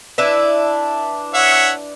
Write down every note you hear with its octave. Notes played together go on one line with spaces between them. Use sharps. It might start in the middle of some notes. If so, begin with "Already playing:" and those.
D4 E4 B4
C#5 E5 F#5